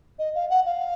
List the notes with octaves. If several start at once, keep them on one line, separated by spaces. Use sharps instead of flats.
D#5
F5
F#5
F5